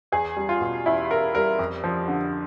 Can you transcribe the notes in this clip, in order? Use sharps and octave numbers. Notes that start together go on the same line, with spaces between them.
E2 G#4
G3
F4
B2
E2 E4
E2 A#4
G3 A#4
F2
F3
D3